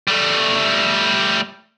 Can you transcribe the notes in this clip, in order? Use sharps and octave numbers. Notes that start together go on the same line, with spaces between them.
G3 A3